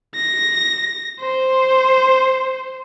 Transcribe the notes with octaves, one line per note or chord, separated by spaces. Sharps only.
A#6
C5